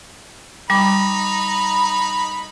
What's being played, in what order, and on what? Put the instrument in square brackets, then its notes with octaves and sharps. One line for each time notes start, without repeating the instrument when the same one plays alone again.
[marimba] G3 D6 [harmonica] D#4 B5